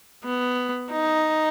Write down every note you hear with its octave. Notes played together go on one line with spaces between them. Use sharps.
B3
D#4